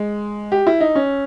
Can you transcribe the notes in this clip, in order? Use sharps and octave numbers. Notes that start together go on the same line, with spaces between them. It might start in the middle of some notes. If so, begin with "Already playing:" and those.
Already playing: G#3
G4
E4
D#4
C#4